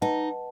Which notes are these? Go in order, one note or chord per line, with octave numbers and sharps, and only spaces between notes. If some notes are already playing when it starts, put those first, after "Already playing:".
D#4 B4 D#5 F#5 A5